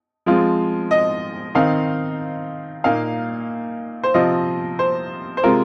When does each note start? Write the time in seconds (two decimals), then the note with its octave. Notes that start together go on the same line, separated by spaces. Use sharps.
0.26 F3 G#3 C4 F4
0.91 D#5
1.55 D#3 C4 D#4 F5
2.84 A#2 A#3 D#4 F5
4.03 C5
4.14 C3 F3 C4 F4 D#5
4.79 C5
5.37 C5
5.43 C3 G#3 F4 A#4